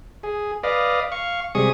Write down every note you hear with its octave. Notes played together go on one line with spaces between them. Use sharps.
G#4
B4 D5 D#5 F5
F5 C#6
C3 G3 G#3 G#4 C#6 D#6